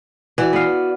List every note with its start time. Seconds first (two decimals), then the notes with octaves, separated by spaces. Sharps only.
0.38 E3 F#4 D5
0.53 B3 F5